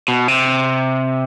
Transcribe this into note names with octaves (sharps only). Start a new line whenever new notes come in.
B2
C3